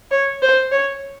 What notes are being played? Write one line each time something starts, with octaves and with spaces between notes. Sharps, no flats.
C#5
C5
C#5